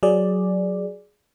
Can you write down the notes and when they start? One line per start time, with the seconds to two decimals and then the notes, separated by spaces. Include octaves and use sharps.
0.03 F#3 G#4 D5